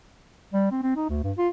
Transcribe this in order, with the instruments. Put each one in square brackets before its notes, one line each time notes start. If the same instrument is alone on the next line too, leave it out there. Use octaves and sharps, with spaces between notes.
[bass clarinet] G3
C4
C4
D#4
D2
G2
F4